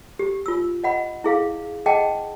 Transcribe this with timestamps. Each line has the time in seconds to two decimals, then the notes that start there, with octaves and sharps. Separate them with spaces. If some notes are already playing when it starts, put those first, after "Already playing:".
0.19 G4
0.46 F4 E6
0.84 D#5 F#5 B5
1.24 E4 G#4 F5
1.86 G#4 D#5 F#5 G5 A5